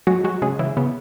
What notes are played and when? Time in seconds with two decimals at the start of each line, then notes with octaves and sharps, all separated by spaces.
0.07 F#3 G#3 F#4
0.24 F#3 G#3 F#4
0.42 C#3 G#3 G#4
0.59 C#3 E3 E4
0.77 C#3 B3